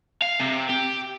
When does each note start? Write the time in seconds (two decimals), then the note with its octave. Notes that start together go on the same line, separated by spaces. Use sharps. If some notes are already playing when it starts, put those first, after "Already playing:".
0.22 F5
0.40 C3
0.69 G4